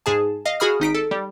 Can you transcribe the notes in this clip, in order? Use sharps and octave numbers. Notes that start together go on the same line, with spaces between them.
G#2 G#4 A5
D#5 F5
F#4 G#4 B5 D#6 F6
G#1 D#4 B6 D7
A4
G3